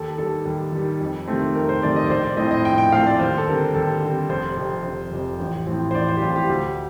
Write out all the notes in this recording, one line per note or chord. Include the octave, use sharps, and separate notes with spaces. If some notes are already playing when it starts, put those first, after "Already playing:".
Already playing: D#2 A4
D#3 G3 A4
D#2
D#3 G3
F2
C3 D#3 A3 C4
F2 A#4
C5
C3 D#3 A3 C4 D5
D#5
D5
A#1 C5
D5
A2 F3 A3 C4 D#5
D#5
A#1 G5
G5
A2 F3 A3 C4 F5
D5
D#2 C5
A4
D3 G3 C4 A#4
D#2 A4
D3 G3 C4
F1 C5
F2 C3
F1
F2 C3
A1
A2 F3 C4
C5
A1 D5
C5
G4
A2 F3 C4 F4
G4
D2 G4